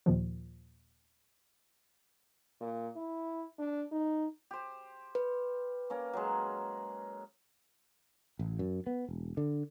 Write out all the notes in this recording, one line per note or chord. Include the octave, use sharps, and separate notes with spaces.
D#2 A#2 D#3 F3
A#2
E4
D4
D#4
G4 C5
B4
A#3 C#4 A#4
F#3 G#3
A1
F#2
B3
E1
D3